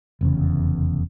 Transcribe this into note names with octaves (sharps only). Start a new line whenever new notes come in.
F1 E2 C#3